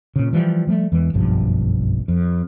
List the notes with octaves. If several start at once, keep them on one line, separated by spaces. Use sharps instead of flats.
A#2 C#3
E3 F3 G3
F3 G3 A3
E2 E3 G#3
F#1 B1 G2 F3
F2